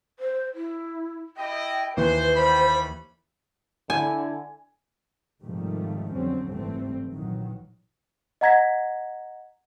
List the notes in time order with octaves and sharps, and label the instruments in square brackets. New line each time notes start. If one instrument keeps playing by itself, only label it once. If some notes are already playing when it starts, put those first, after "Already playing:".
[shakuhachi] C5
E4
[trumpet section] E4 D#5 [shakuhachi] G5
[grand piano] D#2 E3 [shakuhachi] B4 [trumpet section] C5
[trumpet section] G3 B5 [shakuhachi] C5
[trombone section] D3 E4 [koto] G#5
[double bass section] G#2 C3 D#3 F3 G3 A3
F2 D3 F#3 G3 C4 C#4
F#1 G#2 E3 G3 A3 C4
A#1 D#3 E3 F#3
[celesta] D#5 F#5 A#5 G#6 A#6 B6